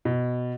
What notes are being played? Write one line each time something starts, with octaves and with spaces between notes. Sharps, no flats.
B2